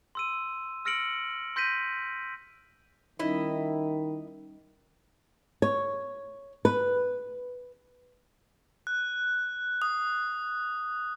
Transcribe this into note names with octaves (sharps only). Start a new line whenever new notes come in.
C6 E6 D#7
E6 F6 A#6 C#7 D7 F#7
C6 G6 A#6 B6 D#7
D#3 G3 C#4 D#4 E4 D#5
C#5
B4
F#6
D#6